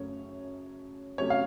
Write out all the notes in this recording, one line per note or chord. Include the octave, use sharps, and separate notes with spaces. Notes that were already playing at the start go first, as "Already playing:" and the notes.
Already playing: F#2 C#3 F#3 A3 C#4 C#5
C3 F#3 A3 C#4 C#5
F5